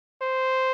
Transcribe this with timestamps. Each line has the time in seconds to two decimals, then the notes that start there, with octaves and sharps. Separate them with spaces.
0.22 C5